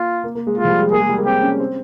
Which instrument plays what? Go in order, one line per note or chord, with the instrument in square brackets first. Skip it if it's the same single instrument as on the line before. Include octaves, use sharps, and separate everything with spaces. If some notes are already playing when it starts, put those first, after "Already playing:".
Already playing: [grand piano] A#3 [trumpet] F4
[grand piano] A#3
A#3
G#3
[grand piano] G#3 [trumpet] F4
[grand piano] F3
G3
G#3
[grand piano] A#3 [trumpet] G#4
[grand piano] G#3
G3
A#3
[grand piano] C4 [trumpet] G4
[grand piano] C#4
C4